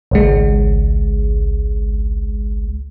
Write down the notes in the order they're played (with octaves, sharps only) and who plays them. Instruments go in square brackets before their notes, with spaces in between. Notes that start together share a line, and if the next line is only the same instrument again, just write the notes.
[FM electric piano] G#1 C#2 G#3